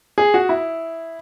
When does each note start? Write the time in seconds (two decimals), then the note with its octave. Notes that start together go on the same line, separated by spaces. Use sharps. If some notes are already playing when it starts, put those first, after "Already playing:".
0.18 G#4
0.34 F#4
0.49 E4